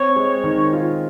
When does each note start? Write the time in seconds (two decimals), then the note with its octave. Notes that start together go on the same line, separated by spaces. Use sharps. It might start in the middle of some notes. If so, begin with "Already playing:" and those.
Already playing: C4 C#5
0.16 G#3
0.44 D#3
0.73 F4